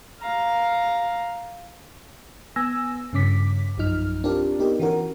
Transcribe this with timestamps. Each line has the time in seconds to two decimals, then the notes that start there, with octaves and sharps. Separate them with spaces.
0.21 F5 A#5
2.56 B3 G#5 E6 A#6
3.13 G2 C#3 C#4 D6 B6
3.77 A#1 F#2 F3 D#4 F6
4.23 C4 D4 F4 G4 A#4 D5
4.59 B3 D#4 G4 A#4
4.80 E3 C#4 F#4 A#4